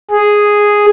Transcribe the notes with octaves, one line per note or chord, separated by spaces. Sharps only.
G#4